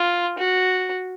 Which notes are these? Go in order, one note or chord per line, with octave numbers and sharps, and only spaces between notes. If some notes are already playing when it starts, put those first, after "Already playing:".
Already playing: F4
F#4